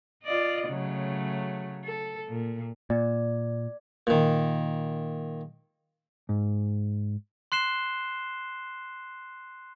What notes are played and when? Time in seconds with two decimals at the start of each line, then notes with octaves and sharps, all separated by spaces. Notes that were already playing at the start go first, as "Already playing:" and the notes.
0.23 F4 D5 D#5
0.69 C#3 F#3 A3
1.84 A4
2.28 A#2
2.90 A#2 D5
4.07 A#2 D#3
6.29 G#2
7.52 C6 F#6 C7 E7 G7